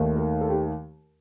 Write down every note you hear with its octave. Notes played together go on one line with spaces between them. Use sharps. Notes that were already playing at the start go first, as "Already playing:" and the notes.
Already playing: D#2 D#3 A3
A#4
A4
G4